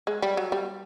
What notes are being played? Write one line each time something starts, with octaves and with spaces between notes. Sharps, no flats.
G#3
G3
F#3
G3